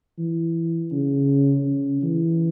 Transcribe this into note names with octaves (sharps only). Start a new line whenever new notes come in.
E3
C#3
C#3
E3